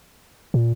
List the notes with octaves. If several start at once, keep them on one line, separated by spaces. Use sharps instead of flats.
A#2